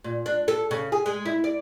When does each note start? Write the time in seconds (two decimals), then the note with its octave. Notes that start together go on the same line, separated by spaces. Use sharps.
0.04 A#2
0.26 D4
0.48 A4
0.71 C#3
0.92 G#4
1.06 G#3
1.26 E4
1.44 D5